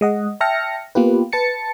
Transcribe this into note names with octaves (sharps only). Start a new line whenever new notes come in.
G#3 D#5 F#5
E5 G5 A5 F6 A#6 C#7
A#3 B3 F4 G4 B4
B4 A5 A6 C#7